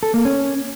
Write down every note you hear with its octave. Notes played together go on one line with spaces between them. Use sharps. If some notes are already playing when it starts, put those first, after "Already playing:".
A4
A#3
C#4